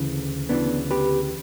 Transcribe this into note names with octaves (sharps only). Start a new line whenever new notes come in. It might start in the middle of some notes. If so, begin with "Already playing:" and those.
Already playing: D2 C#3 E3
D2 C#3 E3 B3 D4
G4 B4